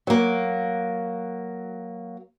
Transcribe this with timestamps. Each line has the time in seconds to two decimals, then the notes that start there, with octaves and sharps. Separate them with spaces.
0.07 F#3 A#3